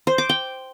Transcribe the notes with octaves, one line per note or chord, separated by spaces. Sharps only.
C5
D6
G5